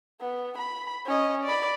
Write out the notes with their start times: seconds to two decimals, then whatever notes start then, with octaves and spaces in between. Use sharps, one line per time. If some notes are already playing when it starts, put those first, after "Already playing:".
0.21 B3
0.58 B5
1.06 C#4 D#5
1.44 D5 B5